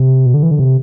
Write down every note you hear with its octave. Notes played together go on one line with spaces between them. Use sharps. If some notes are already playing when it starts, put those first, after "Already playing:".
Already playing: C3
B2
D3
E3
D3
C3